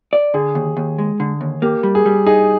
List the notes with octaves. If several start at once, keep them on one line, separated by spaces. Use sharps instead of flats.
D5
D3 G#4
D#2
D#2
G#3
D3
D#2
A#3 G4
G3
G#4
G3
D#4 G#4